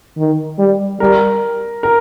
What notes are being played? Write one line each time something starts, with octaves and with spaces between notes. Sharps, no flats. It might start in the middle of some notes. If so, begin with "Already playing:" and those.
D#3
G3
G3 A#4
A#4